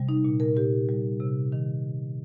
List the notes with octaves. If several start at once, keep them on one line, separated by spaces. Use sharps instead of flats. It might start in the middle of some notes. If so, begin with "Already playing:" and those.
Already playing: C3 G3
D#4
A#2
A#4
A#2 G4
G3
C3
D#3